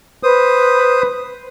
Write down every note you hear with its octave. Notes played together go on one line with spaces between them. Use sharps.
B4 C5 D#6